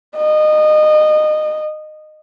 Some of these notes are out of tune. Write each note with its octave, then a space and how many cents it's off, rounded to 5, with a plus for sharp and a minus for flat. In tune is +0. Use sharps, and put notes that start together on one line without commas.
D#5 -25